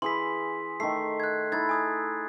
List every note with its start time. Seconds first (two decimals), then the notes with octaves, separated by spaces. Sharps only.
0.02 E3 G#4 C6 B6
0.80 D#3 A3 C7
1.20 F#6 G#6
1.52 D#4 E4 A4 G#6 A6
1.69 G#5 D#6 G#6